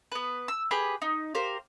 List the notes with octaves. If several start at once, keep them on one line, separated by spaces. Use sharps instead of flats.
B3 B4
E6
G4 G#4 B4 B5
D#4
G4 A#4 C5 F5